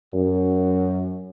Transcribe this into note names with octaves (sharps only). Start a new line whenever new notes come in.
F#2